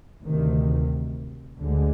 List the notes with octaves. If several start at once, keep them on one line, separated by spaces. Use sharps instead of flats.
D2 C3 D#3
D2 D3 G#3